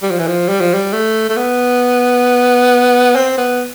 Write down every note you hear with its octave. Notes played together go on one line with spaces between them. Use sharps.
G3
F3
E3
F3
G3
F3
G3
A3
A3
B3
C4
B3